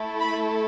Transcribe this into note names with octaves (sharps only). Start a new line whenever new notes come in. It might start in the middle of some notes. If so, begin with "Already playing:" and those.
Already playing: A3 E4 A4
B5